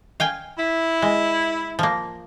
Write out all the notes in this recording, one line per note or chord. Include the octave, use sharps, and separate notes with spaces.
F5 G5 G#5
E4
G#3
F3 A#3